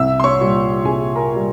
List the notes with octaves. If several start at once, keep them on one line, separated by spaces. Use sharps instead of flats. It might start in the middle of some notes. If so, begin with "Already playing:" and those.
Already playing: C2 E5 E6
C6
C#5 C#6
A#2 G3
C2 G#4 G#5
A#4 A#5
A#2 G3